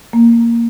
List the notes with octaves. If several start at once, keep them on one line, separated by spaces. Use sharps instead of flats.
A#3